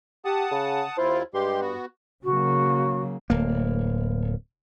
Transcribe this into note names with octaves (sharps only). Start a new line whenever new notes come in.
G4 F#5 A5 D#6
C#3
D#2 E4 F4 C5
G2 G#3 G4 C6
B3 F#4
C#3 F#3 A#3 F#4
D1 A#3